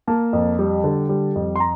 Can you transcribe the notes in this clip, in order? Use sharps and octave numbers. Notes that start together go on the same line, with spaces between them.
A#3 A5
F2
G3
D3
G3
F2
C6
A#5